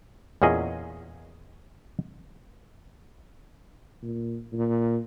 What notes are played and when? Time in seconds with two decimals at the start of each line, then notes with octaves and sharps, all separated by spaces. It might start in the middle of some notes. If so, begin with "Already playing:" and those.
0.42 E2 A#2 C#4 G#4 D#5
4.02 A#2
4.53 A#2